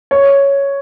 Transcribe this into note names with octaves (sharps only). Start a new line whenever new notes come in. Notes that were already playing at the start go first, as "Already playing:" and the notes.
C#5